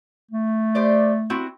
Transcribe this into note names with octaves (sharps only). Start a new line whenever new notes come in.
A3
G4 C5 D5
C4 E4 F#4